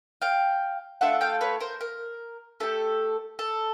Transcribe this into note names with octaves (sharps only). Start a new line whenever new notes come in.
F5 G5
A3 D4 F4 A4 E5 F#5
F5 G5
B4 C#5
A#4 C5
A#4
A3 D4 G4 A4
A4